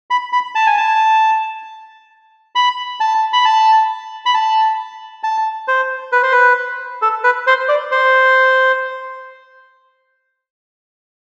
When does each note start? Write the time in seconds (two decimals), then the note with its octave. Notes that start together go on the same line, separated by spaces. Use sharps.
0.10 B5
0.33 B5
0.55 A5
0.66 G#5
0.77 A5
2.55 B5
3.00 A5
3.33 B5
3.45 A5
4.26 B5
4.34 A5
5.23 A5
5.68 C5
6.12 B4
6.23 C5
6.32 B4
7.02 A4
7.24 B4
7.47 C5
7.69 D5
7.92 C5